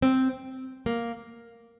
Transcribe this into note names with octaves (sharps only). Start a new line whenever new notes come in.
C4
A#3